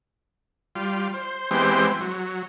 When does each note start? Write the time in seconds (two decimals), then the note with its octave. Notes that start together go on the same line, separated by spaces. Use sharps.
0.75 G3 F4
1.14 C5
1.51 E3 G#3 B3 C4 G4 C5
2.01 F#3